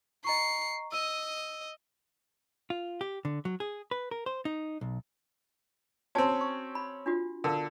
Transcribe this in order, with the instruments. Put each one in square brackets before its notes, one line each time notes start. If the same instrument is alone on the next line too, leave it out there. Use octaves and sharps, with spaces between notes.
[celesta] D#5 A#5 C#6 [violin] C7 C#7
[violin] D#5 [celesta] E6 D#7
[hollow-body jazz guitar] F4
G4
D3
F#3
G#4
B4
A#4
C5
D#4
B1
[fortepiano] C4 C#4 [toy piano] F#4 G#5 A5
[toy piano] C#6
B5
D4 F4 F#4
[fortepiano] D3 [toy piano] A#4 F5